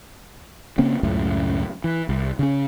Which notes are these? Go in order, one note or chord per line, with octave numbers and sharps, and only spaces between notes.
C#3 A#3 C4 C#4
C#2 F#2 A2 C#3
E3
C2
C#3 C#4